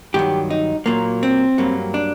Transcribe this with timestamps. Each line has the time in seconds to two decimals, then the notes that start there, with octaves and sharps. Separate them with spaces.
0.14 G2 D#3 F#3 G4
0.50 D#4
0.86 A#2 F#3 A#3
1.23 C4
1.58 G2 F#3 A#3
1.94 D4